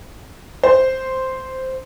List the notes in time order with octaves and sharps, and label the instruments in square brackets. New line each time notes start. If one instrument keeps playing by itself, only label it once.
[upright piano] C5